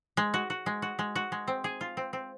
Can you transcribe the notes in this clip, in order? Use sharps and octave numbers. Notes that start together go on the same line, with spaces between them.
G#3
F#4
F#4
G#3
F#4
G#3
F#4
G#3
C4
G#4
F4
C4
C4